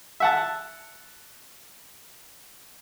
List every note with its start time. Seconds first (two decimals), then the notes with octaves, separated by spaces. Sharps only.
0.20 E5 F#5 A5